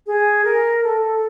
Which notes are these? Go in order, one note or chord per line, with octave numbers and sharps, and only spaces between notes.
G#4
A#4
A4